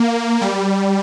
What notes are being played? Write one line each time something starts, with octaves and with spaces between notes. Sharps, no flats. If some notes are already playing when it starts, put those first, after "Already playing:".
Already playing: A#3
G3